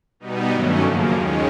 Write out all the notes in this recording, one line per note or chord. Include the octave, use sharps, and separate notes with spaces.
B2 G3 B3 D#4
G2 D#3 F#3 A3 C#4
F#2 C#3 F3 A#3
D#2 D#3 G#3 C#4